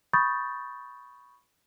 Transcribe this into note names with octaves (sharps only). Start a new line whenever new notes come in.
B5 C#6 D#6 G6 A6